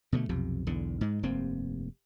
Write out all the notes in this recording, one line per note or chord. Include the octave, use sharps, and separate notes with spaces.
B2 D3 F3 A3
B1 F2 C3
B1 E2 D3
G#2 G#3
F1 G2 A#3 C4